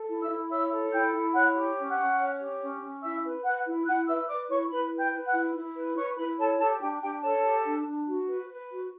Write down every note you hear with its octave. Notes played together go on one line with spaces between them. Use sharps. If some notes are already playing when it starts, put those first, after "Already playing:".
Already playing: A4
E4
E5 E6
E4
C#5 E5 E6
A4
E4 G5 G6
E4
C#5 F#5 F#6
G4
C#4
F#5 F#6
C#4
C#5
G4
C#4
C#4
E4 E5 E6
B4
B4 F#5 F#6
E4
E4 F#5 F#6
B4 E5 E6
B4 D5 D6
E4 C#5 C#6
E4 B4 B5
B4
G5 G6
B4
F#5 F#6
E4
E4
B4
B4 C#5 C#6
E4 B4 B5
A4 C#5 A5
G4 A4 A5
D4 G4 G5
D4 G4 G5
A4 C#5 A5
G4
D4
D4
F#4
B4
B4
F#4